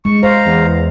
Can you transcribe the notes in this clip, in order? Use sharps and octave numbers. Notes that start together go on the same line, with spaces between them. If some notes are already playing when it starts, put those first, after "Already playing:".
G#3 C#6
C5 F5 A#5
E2